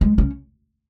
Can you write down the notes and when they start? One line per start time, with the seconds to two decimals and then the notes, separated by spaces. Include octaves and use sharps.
0.01 G#3
0.18 C#4